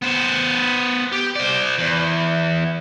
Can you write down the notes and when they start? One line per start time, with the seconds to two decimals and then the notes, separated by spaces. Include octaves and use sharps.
0.02 B3 C5
1.12 G4
1.36 C5 D5
1.78 E2